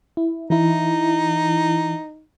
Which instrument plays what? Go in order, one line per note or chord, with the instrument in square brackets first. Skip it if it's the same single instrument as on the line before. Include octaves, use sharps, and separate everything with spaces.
[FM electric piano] E4
[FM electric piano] E3 E4 [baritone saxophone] D#4